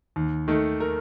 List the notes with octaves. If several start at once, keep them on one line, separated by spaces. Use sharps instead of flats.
D#2
D#3 A3
A#4